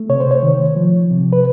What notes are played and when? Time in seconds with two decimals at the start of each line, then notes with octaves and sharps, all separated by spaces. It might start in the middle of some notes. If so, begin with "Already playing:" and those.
Already playing: A3
0.09 C3 C#5
0.20 C5
0.31 C#5
0.43 D#3
0.76 F3
1.11 C3
1.33 B4